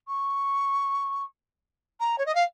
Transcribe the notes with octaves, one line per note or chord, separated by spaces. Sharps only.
C#6
A#5
C#5
D#5
F5